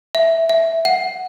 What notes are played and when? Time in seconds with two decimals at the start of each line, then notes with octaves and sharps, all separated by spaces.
0.15 E5
0.49 E5
0.85 F#5